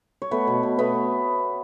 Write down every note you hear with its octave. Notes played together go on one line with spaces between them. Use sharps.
C#5
A3 B3 B4
B2
B2
A3 B3 B4